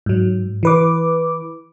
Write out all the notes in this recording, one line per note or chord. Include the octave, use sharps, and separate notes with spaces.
G#2 F#3
E3 B4 D6